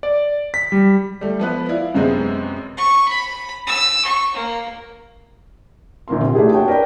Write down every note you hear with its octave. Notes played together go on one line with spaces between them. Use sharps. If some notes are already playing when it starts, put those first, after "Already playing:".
D5
B6
G3
G3 A3
F3 B3 B4
E4 D5 F5
F#2 C3 G#3 B3 C4
C#6
B5
E6
C#6
A#3
A#1 D3 A#3 A#4 C6
C3
A3 D4 E4 G4 G#4
A#3 F#4 C#5 G5 A5
A#4 B4 D5 G5